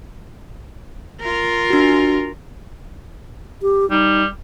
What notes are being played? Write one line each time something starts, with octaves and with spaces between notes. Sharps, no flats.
F4 A#4
D4 F#4
G4
G3 D#4